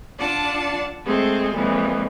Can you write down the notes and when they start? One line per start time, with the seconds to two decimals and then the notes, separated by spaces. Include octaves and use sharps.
0.18 D4 F4 D5 F#5 A5
1.04 G#3 A3 C4 G#4 A4
1.53 F2 A#2 E3 G#3